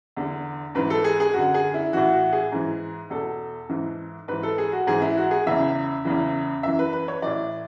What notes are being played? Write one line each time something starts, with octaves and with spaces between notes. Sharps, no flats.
E2 D3
G#2 E3 B4
A4
G#4
G#4
F#2 D3 F#4
G#4
E4
A2 E3 F#4
F#4
G#4
G#2 E3
E2 B2 A4
G#2 E3
G#2 E3 B4
A4
G#4
F#4
G#2 E3 G#4
E4
F#4
G#4
E2 C#3 E3 E5
E2 C#3 E3
F#2 E3 E5
B4
B4
C#5
A2 E3 D5